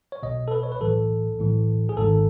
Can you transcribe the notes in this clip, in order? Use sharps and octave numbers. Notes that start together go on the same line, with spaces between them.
C#5
B1 B2 D#5
A4
B4
C#5
B4
B1 A2 E3 A4
B1 A2 E3
G#4
G#1 G#2 D#3 A4